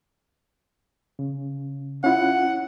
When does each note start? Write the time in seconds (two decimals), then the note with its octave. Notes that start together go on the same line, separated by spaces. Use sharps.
1.19 C#3
2.04 C#4 E4 F4 F#5